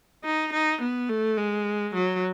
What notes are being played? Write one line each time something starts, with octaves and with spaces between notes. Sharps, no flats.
D#4
D#4
B3
A3
G#3
F#3